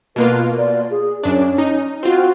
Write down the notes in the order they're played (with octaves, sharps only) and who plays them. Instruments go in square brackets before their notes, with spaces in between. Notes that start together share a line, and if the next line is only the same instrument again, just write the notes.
[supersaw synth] B2 A#3 F4 [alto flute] B4
[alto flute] D5
G#4
[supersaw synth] F#2 D4 [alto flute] C#4
[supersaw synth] D#4
[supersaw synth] C4 F4 [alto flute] F#4